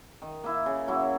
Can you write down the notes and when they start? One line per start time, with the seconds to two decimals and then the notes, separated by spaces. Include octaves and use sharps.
0.22 D#3
0.44 A#3 E4
0.66 C#3
0.88 F#3 A#3 E4